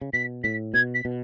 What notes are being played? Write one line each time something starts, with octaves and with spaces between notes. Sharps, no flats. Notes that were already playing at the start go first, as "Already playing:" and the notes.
C#3
B2 B6
A2 B6
B2 G#6
B6
B2